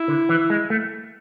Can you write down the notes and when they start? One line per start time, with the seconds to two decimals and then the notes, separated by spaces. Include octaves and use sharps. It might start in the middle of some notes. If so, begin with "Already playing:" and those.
Already playing: E4
0.08 D3
0.29 E3
0.50 G#3
0.70 A3